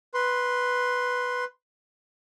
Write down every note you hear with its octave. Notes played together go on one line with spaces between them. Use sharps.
B4 C6